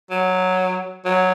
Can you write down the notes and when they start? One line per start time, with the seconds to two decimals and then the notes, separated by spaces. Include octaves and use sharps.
0.11 F#3
1.05 F#3